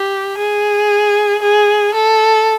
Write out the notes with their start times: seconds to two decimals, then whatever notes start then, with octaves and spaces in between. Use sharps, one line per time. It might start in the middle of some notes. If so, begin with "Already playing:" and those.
Already playing: G4
0.38 G#4
1.42 G#4
1.94 A4